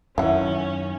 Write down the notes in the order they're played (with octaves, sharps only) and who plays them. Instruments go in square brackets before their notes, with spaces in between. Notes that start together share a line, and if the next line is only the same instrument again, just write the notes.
[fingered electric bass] F#2 D#3 [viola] C#4 [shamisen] E4 F#5